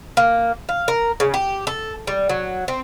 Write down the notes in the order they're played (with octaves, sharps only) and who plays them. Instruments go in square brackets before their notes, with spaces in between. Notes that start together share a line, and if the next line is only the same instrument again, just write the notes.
[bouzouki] A#3
F5
A#4
C#3
G4
A4
G3
F#3
C4